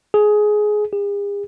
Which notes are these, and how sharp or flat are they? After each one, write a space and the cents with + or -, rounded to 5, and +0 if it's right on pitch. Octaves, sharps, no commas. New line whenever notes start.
G#4 +15
G#4 -45